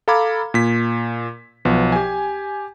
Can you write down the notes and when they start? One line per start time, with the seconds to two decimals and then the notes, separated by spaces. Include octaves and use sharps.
0.08 A4 F5 A#5 B5 D6 G#6
0.54 A#2 B6
1.65 B1 F3 B3
1.92 G4 G#5